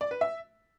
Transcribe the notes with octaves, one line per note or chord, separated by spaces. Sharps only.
D5
B4
E5